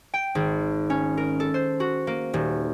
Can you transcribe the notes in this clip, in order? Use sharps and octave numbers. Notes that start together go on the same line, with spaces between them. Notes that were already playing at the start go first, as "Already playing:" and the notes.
G5
G#1
C#4
A#4
A4
C5
F#4
A#3
D#1